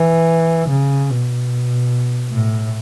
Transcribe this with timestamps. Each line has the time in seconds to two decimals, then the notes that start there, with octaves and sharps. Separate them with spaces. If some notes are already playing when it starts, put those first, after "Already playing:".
Already playing: E3
0.69 C#3
1.10 B2
2.32 A2